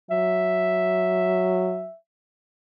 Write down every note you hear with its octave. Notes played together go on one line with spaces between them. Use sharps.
F#3 E5